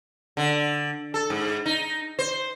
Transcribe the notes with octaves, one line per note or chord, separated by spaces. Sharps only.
D3
A4
G#2
D#4
C5